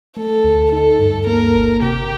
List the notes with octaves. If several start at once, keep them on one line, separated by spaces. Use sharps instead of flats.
A3 A4
D2
D#4 A4
G2
A#3 A#4
G1
C3 G4